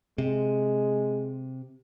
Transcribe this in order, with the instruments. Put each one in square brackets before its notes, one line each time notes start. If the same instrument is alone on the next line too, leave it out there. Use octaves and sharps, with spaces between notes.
[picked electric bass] C3 [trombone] G#3